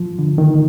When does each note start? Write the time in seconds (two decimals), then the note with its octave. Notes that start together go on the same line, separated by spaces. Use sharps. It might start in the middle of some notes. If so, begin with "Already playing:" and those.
Already playing: F3
0.19 D3
0.38 D#3